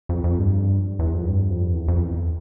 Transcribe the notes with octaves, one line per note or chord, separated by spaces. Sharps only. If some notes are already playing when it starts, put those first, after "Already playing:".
F2
F2
G2
E2
F2
G2
F2
E2
F2
E2